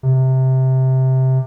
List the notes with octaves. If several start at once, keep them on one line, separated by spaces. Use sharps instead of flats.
C3